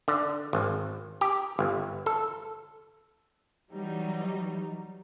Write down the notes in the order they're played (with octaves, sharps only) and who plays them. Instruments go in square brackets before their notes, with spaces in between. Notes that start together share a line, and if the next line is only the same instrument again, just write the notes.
[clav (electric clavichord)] D3
G#1
G4
G1
A4
[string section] E3 F#3 G3 D#4